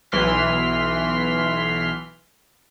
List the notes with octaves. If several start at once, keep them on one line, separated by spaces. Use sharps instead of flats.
B1 E3 C6 F6 B6